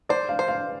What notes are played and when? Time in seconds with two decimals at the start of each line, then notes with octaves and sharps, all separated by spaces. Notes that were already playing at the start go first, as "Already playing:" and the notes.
0.09 C5 D5
0.29 F5
0.39 C5
0.48 F5